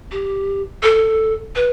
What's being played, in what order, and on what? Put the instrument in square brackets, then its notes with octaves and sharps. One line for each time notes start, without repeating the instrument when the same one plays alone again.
[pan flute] G4
A4
B4